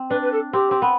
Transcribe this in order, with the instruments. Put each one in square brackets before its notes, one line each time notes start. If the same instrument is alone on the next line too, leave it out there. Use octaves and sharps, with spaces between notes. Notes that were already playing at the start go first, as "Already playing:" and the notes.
Already playing: [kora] C4
[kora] D4 [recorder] B4
[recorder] B4
A4
[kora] C4 [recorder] G4
[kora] C4
B3